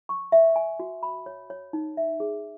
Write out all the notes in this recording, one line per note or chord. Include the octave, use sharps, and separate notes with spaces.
C#6
E5
G#5
F#4
B5
C#5
C#5
D#4
E5
G#4